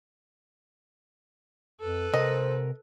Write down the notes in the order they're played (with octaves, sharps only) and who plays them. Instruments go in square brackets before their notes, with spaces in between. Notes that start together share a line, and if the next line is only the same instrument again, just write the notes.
[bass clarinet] F2 [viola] A4 B4
[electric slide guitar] C3 A#4 [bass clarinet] C5 [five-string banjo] D#5